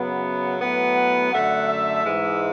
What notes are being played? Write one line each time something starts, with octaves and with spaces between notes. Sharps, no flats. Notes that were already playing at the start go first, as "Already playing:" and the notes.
Already playing: F#2 C#3 F#3 B3
A2 F#3 B3
F#5
F#2 D3 A3 F#5
E5
G#2 E3 G#3